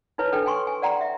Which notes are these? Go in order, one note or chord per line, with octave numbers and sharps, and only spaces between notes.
D#4 E4 B4 C#5
D4 D#4 A4 B4 G5
G5 G#5 C6 C#6
G#5
D5 F#5 G5 A#5 C6
E5